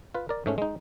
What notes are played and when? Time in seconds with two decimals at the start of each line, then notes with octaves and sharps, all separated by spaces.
0.15 F4 B4
0.29 A#4 D5
0.46 G#2 A3 C#4
0.58 G#3 D#4